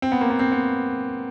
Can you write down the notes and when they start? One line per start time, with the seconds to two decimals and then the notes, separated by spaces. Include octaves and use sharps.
0.02 C4
0.12 B3
0.21 A#3
0.30 B3
0.39 C4
0.52 B3